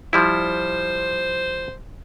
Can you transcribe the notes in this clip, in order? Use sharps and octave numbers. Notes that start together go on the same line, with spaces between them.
F3 G3 E4 C5